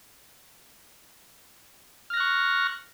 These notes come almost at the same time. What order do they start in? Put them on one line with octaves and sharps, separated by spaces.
F6 A#6 F#6 C#6